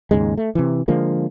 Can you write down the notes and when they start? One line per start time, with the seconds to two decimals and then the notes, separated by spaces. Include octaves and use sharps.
0.11 D#2 G#2 C#3 G#3
0.37 A3
0.55 C3 E3
0.88 D3 F3 G#3 A#3